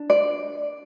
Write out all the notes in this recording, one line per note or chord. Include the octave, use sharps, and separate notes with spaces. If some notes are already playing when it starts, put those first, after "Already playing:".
Already playing: D4
D5